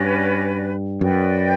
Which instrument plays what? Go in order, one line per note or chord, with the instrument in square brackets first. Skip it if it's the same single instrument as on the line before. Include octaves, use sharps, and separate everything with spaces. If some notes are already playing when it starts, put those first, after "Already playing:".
Already playing: [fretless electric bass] G2 [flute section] C#4 F#4 B4 D5
[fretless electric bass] F#2 [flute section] F#4 B4 D5 G5